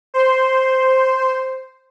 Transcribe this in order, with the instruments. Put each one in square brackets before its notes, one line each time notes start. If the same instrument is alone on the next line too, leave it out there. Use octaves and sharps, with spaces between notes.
[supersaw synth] C5 C6